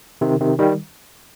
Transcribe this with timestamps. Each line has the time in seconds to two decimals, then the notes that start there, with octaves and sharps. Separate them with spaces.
0.21 C3 D#3
0.40 C3 D#3
0.59 D#3 G3